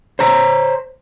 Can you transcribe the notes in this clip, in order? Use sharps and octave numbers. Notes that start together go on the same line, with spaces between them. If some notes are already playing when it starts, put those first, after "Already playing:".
C5 C#5 A#5